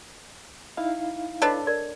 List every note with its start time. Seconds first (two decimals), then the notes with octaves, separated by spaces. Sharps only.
0.77 D#4 E4 F5
1.42 D4 A4 B4 C#5 D#5
1.67 A#4 D5